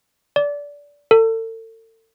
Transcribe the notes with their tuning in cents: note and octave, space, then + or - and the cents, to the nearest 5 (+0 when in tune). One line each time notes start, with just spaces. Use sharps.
D5 -20
A4 +40